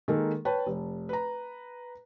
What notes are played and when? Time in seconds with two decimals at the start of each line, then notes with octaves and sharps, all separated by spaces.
0.08 D#3 G#3 A#3 A4 A#4
0.45 B4 C#5 G5 A5
0.66 F1
1.09 B4 A#5